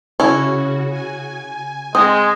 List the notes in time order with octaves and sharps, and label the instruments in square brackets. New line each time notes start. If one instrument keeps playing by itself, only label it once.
[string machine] C#3 F#4 [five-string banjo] C#4 E4
[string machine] G#5
[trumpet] G#3 [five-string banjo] C4 [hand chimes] D#6